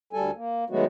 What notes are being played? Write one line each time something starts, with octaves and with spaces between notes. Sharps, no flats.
D2 G3 A4 G#5
A#3
D#3 F#3 G#3 A3 B3 F#4